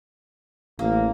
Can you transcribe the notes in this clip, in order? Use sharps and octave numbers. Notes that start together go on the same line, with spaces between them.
A1 A#3